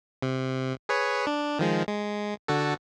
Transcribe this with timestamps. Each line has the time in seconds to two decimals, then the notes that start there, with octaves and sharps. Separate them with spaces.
0.22 C3
0.89 G#4 B4 C#5
1.27 D4
1.59 D#3 F3 G#3
1.88 G#3
2.48 D3 F#4 A4